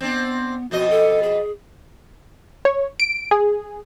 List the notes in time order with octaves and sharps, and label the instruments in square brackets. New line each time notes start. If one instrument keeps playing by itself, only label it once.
[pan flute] B3 [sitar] C4 D4
[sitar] F2 B2 D#5 [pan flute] F#4
[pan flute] A4
G#4
[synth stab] C#5
D7
G#4